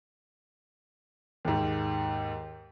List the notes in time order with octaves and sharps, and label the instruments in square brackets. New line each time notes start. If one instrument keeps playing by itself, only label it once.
[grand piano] D#2 G#2